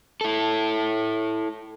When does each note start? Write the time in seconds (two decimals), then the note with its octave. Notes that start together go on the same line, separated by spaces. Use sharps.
0.21 E4 A4